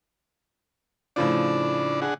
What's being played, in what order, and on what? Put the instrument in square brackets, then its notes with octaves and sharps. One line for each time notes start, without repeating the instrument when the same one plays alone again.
[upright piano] A2 C#3 F3 [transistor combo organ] D4 D5
[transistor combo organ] D4 G#4 F#5